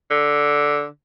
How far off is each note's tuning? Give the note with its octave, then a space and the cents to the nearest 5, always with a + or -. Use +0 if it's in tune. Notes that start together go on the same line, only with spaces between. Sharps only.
D3 -5